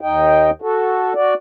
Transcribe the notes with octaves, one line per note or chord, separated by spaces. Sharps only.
D#2 D#4 D#5 G5
F#4 A4
F#4 D5